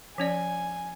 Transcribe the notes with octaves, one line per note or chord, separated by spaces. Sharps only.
F3 C#4 D5 G#5